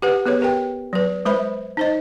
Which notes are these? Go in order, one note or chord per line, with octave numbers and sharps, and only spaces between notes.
G4 B4 F#5
B3 G#4 B4 C#5
G4 A#4 B4 G5
F#3 B4
G#3 B4 C5 E5 B5
D#4 C5 D#5